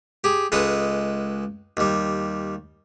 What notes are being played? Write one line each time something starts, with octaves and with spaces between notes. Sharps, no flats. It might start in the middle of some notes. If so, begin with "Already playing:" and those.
G4 G#4
C#2 G#3 A4 B4 D#6
D#2 G3